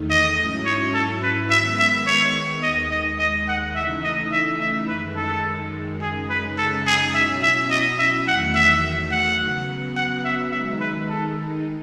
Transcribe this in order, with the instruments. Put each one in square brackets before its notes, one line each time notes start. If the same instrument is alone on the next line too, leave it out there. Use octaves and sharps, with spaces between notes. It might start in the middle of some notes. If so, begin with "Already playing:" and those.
Already playing: [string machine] E2 D#3 A3 D#4
[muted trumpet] D#5
[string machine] G#2 F#3 C#4 E4
[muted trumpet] C#5
A4
B4
[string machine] D#3 G#3 B3 [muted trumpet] E5
[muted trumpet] E5
C#5
[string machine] D#2 D#3 G#3 [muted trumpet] D#5
[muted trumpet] D#5
D#5
F#5
[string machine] C#3 E3 A3 D#4 [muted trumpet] E5
[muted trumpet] D#5
E5
E5
[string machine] F#2 D#3 G#3 [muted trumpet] B4
[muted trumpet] A4
[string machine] F#2 C#3 G#3 D#4 [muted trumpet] G#4
[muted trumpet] B4
A4
G#4
[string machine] B2 F#3 C#4 E4 [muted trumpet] E5
[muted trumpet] E5
D#5
E5
[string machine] E2 D#3 F#3 A3 [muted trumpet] F#5
[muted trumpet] E5
F#5
[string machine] C#3 F#3 B3
[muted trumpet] F#5
E5
[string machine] D#3 G#3 D#4 [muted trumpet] E5
[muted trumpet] B4
A4